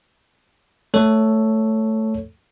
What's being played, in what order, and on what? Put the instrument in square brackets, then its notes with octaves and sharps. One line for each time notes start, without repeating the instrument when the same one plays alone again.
[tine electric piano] A3 A4 C#5